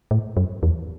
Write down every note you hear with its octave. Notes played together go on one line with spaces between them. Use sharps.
A2
F#2
E2